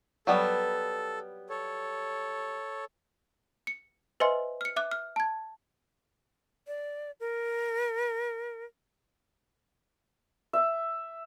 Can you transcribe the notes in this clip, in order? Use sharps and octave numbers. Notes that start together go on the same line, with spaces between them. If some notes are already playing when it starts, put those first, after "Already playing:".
F#3 G3 B3 A4
A4 C#5
C#7
B4 C5 D#5 E5 G#5 C6
F6 C#7
E5 D6 F#6
F6
A5 G#6
D5
A#4
E5